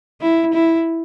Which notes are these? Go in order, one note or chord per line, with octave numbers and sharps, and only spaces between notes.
E4
E4